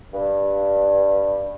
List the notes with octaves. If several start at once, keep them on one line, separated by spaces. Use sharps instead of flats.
G2